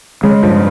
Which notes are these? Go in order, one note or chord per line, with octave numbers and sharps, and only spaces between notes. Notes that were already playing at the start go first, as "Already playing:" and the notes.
C#3 G#3
G2 F3